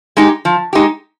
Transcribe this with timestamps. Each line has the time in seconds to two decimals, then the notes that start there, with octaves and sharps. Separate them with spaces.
0.17 G#3 D#4 G4
0.45 F3
0.73 G#3 D#4 G4